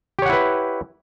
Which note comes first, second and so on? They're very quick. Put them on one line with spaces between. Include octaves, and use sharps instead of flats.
G4 C#5 F#5 E4 B4